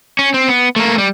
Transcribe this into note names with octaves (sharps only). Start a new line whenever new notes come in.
C#4
C4
B3
A3 A#3
G3